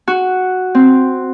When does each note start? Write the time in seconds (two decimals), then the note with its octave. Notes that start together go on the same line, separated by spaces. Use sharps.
0.08 F#4
0.75 C4